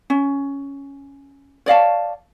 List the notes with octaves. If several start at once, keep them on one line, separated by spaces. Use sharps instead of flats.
C#4
C#5 D5 F5 A5